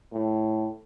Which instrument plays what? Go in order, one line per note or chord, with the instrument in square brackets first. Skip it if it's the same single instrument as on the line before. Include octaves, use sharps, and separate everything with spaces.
[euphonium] A2